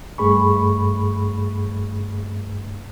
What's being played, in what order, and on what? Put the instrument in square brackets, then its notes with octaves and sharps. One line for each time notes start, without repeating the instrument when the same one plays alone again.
[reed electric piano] G2 A3 G#4 B5 C#6